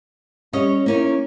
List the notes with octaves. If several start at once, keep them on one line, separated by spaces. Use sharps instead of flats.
G3 C#4 C#5 D#5
A#3 C#4 D#4 E4